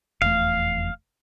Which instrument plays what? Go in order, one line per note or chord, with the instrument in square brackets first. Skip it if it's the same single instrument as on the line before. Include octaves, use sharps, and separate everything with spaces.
[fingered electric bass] F1 E2 A3 [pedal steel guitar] F5